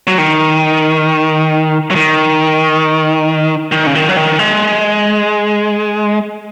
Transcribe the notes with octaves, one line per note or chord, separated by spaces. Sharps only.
F#3
D#3
F#3
D#3
D#3
C#3
D#3
F#3
D#3
G#3